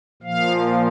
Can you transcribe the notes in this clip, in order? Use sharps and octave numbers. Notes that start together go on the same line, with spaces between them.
A#2 F3 F5